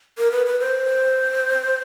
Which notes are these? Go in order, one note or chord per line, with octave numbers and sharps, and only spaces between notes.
A#4
B4
B4
C5